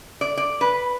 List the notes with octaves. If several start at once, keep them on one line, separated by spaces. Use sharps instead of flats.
D5
D5
B4